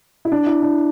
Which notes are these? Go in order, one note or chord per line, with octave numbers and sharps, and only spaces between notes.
E4
D4
E4
D4